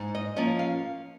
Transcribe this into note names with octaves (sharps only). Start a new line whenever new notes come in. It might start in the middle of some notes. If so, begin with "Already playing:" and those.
Already playing: G#2
D#5
F3 A#3 C#4 D#5
F5